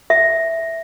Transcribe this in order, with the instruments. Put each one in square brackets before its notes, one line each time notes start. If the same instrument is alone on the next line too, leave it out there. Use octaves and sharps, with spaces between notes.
[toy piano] E5